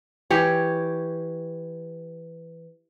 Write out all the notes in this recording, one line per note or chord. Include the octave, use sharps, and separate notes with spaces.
E3 G4 C#5